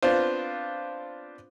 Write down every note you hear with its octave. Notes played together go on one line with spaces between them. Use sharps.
B3 C4 D4 F4 C5